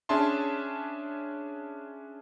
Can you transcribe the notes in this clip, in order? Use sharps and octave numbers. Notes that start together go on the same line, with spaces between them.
C#4 D4 G#4 E5 A5 C6